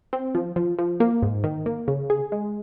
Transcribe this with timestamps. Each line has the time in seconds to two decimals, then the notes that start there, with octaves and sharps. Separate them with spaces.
0.13 C4
0.35 F3
0.56 F3
0.79 F3
1.00 A#3
1.22 G#2
1.44 D#3
1.66 A#3
1.88 C#3
2.10 G#4
2.32 G#3